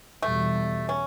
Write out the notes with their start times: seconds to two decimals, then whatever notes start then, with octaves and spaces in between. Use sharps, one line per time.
0.22 E2 B2 G3 A3
0.89 C#4